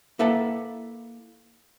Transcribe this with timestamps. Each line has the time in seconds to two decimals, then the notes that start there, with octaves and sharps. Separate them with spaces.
0.19 A#3 E4 A4 B4 F#5 A5